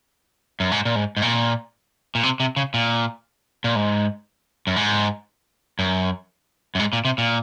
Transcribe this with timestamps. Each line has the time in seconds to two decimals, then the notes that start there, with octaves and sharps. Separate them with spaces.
0.60 F#2
0.71 G#2
0.85 A#2
0.96 G#2
1.17 G#2
1.22 A#2
2.15 A#2
2.23 C3
2.40 C3
2.56 C#3
2.74 A#2
3.64 A#2
3.76 G#2
4.67 F#2
4.76 G#2
5.79 F#2
6.75 F#2
6.79 G#2
6.93 A#2
7.05 C3
7.18 A#2